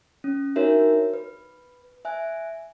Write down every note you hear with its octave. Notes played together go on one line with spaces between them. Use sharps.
C#4
D4 D#4 F#4 A#4 C#5 E5
B4
E5 G#5 F#6